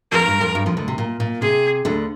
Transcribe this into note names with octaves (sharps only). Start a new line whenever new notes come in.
F2 F3 A#4
G2 G3
F2 F3
G2 G3
F2 F3
D2 D3
C3
A#2
A#2
C3 G#4
D2 D3